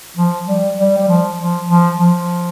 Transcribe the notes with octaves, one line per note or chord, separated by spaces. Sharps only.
F3
G3
G3
G3
F3
F3
F3
F3